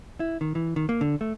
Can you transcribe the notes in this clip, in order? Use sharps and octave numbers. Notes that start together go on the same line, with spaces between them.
E4
D#3
E3
D#3
A#3
D3
A3